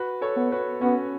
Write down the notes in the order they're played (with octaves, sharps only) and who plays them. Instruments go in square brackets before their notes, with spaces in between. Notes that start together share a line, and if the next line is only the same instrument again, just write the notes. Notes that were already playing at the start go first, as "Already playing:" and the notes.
Already playing: [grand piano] F#4 B4
A4 C#5
[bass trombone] B3
[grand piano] F#4 B4
[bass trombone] B3 [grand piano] C#4 F#4